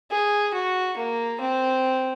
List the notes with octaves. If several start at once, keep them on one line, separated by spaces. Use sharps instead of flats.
G#4
F#4
A#3
C4